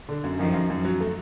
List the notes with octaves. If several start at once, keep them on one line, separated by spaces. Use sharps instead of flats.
D3
F#2
F#2 D#3 F3
F#2
F#2
F#3
A3